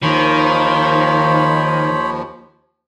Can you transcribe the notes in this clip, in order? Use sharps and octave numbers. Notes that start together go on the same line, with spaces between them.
D#2 D#3 F3 C5 C#5 B5